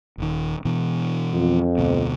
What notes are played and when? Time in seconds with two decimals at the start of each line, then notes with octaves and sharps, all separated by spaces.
0.18 D#1 D#3
0.65 B2 E3
1.33 F2
1.78 D2 B2